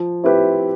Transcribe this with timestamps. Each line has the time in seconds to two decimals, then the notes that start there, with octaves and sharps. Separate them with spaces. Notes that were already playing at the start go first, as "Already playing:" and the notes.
Already playing: F3
0.24 C4 E4 G4 B4